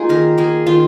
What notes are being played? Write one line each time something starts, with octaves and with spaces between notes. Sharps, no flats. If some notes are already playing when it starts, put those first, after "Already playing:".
Already playing: A#3 D#4 F4 G#4
D#3 A#4
A#3 G#4
D#3 F4